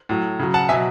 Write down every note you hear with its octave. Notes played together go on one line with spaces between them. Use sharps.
A2 F#3
C#3 F#3
F#5 A5
B2 F#3 E5 G#5